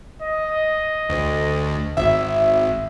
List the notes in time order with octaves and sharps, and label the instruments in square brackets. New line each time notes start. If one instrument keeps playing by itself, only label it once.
[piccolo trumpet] D#5
[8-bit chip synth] D2
[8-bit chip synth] G#1 [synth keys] E5